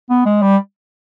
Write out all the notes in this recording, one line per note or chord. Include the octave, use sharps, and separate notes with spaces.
B3
G#3
G3